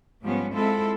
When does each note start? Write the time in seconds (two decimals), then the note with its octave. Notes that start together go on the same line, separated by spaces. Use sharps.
0.23 G#2 F3 G3 B3 C#4
0.54 G#3 C4 E4 F4 A4